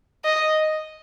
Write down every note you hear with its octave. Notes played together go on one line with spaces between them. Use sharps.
D#5